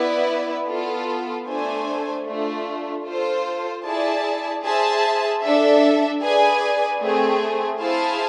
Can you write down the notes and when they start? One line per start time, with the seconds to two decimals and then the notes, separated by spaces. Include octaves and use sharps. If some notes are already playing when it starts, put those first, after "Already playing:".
Already playing: B3 E4 B4 D5
0.68 B3 F4 A4
1.47 A3 D4 A4 C5 G#5
2.26 A3 D4 F4
3.05 F4 A4 C5
3.84 E4 G#4 D5 A5
4.64 G#4 C5 E5 A5
5.43 D4 A4 E5
6.22 G#4 B4 D5 G#5
7.01 A3 C4 G#4
7.80 E4 G#4 C5 F5 A5